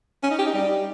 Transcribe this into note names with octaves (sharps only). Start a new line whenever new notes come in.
C#4
D#4
G4
D#4
G3